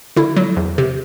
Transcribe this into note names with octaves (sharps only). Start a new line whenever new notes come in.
D3 E4
F#3
E2
C3